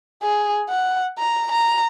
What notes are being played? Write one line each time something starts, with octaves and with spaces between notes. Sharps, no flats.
G#4
F#5
A#5
A#5